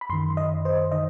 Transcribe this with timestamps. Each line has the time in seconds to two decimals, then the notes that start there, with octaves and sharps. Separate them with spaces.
0.01 B5
0.10 F#2 D#3 C6
0.37 D#5
0.65 C5
0.92 D#3 D#5